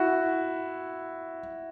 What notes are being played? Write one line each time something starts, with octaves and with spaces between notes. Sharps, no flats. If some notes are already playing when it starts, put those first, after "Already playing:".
Already playing: E4 F#4